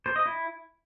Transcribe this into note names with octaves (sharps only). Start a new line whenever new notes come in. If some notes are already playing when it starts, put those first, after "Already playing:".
C5
D#5
E4